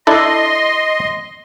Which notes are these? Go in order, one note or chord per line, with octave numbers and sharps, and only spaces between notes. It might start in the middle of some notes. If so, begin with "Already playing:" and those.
D4 E4 A4 D#5 C6